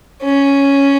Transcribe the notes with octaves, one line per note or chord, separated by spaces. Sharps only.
C#4